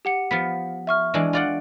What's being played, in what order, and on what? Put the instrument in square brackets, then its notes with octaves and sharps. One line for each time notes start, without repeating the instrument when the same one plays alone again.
[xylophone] G4 F#5 C#7
[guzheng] F3 B3 [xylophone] B6
[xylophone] E5 C#6 F6
[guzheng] E3 G#3 D4
F4 D5 F#5